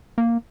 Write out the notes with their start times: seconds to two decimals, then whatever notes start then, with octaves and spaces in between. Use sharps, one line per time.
0.18 A#3